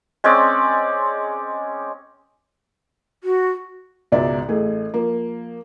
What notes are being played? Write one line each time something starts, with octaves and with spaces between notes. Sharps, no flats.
G#3 C4 C#4 D5
F#4
C#2 G#2 B2 D5 E5
A1 A3 G#4
F3 A#3